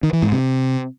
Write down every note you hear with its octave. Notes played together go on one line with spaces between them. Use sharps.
D#3
E3
G#2
C3